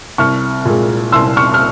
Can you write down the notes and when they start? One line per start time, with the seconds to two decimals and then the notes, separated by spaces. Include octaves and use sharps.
0.18 C2 C#6 F6
0.65 A#2 G#3
1.12 C2 C6 E6
1.37 C#6 F6
1.54 F6